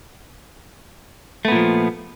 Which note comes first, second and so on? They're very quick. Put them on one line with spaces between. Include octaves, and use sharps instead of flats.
A3 B3 A#2 F3